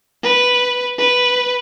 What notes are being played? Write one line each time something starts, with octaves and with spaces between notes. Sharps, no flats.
B4
B4